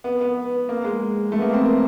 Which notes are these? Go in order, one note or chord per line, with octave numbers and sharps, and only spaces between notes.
B3
B3
A#3
G#3
A3
B3
A#3
C4
A#3